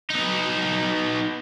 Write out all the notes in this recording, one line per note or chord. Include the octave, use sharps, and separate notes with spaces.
B3 D#4